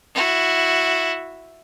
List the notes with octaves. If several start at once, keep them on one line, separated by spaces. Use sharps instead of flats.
E4 F#4